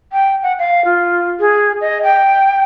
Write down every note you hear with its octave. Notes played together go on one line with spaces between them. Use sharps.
G5
F#5
F5
F4
G#4
D#5
G5